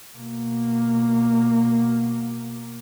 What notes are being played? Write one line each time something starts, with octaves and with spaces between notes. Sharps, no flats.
B2 A#3